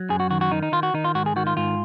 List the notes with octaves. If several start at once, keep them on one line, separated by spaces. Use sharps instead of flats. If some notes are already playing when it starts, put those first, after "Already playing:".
Already playing: F#3
F#2 G#4
F#4
D#3 F#4
F#4
D#3 D#4
D#4
D#3 F4
F#4
D#3 D#4
F4
G#2 F#4
G#4
D#3 F#4
F4
G#2 F4